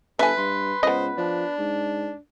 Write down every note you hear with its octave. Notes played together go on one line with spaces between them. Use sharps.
G1 A4 B4 E5 G#5
G2 C6
C#2 B3 C5 D#5
F3 D4
G#2